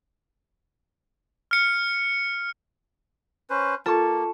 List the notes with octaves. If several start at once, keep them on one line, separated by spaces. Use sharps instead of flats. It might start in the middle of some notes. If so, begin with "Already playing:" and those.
F6 C#7
C#4 B4 C5
A#3 F4 A4 A5 C#6